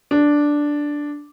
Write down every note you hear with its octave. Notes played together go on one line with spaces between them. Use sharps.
D4